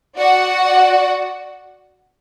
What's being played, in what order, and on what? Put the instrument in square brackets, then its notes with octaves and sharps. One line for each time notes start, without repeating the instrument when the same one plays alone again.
[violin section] F#4 D5 F#5